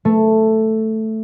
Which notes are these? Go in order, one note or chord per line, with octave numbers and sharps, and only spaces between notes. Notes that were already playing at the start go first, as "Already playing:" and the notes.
A3